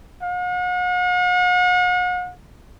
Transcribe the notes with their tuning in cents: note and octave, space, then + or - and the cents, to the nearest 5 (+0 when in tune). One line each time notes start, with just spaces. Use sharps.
F#5 -45